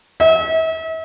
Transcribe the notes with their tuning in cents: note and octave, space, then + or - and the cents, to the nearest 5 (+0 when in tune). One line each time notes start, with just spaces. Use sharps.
E5 -40